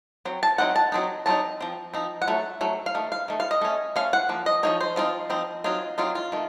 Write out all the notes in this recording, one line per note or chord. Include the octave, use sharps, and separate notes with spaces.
F#3 C4
A5
F#3 C4 D#4 F#5
A5
F#3 C4 D#4
F#3 C4 D#4 A5
F3 C4
F3 C4 D#4
F#5
F#3 A3
F#3 A3
F5
D#3 A3
F5
D#3 A3
F5
D#5
A3 C#4
A3 C#4 F5
F#5
F3 A#3
D#5
F3 A#3 D#4 C#5
C5
F3 C4 D#4 F4
F3 C4 D#4
F#3 C4 D#4 F4
F#3 C4 D#4 F4
F4
D#3 A3